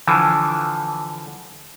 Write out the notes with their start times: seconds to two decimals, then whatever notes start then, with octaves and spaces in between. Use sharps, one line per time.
0.07 D3 E3 F3